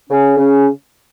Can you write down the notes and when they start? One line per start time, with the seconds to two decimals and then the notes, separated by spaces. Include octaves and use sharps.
0.09 C#3 C#4
0.38 C#3 C#4